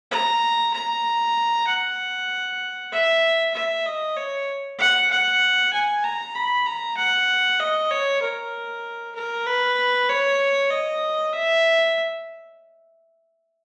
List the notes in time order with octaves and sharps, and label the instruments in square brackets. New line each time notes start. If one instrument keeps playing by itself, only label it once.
[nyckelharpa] A#5
A#5
F#5
E5
E5
D#5
C#5
F#5
F#5
G#5
A#5
B5
A#5
F#5
D#5
C#5
A#4
A#4
B4
C#5
D#5
E5